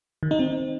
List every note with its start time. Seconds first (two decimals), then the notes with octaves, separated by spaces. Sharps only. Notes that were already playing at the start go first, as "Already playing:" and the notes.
0.23 D#3
0.31 D#4
0.39 C4